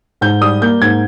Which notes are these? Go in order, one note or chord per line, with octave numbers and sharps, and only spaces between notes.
G#2 G6
G3 D#6
A#3 G6
G#2 G#6